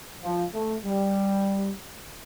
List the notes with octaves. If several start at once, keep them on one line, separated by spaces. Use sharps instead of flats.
F3
A3
G3